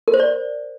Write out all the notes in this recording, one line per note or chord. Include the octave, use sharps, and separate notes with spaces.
A#4
C5
D5